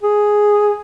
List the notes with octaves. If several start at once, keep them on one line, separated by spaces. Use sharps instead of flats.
G#4